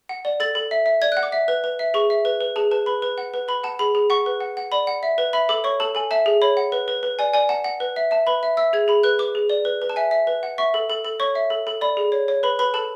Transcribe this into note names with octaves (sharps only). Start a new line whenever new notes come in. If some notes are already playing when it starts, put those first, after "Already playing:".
F#5
D5
A4 A6
A4
E5
E5
D5 G#6
F#6
F#5
D6
E5
B4
B4
E5
G#4 C#6
E5
B4
B4
G#4 A5
B4 A5
B4 B5
B4
F#5
B4
B4 B5
F#5 A5
G#4 B5
G#4
F#5 C#6
B4
F#5
F#5
D5 B5
F#5
E5
B4
E5 B5
A4 D6
C#5 C#6
A4 A5
A4 G#5
E5 A5
G#4
C#5 B5
F#5
B4
B4
B4
D5 G#5
D5 G#5
F#5 A5
F#5
B4
E5
E5 A5
B4 B5
E5
E5 E6
G#4 G#6
G#4 B5
B4 F#6
B4 D6
G#4
D5
B4
B4
A5
E5 G#5
E5
B4
F#5
E5 C#6
A4
A4
A4
C#5 C#6
E5
A4
A4
D5 B5
G#4
C#5
C#5
B4 B5
B4 B5
A4 A5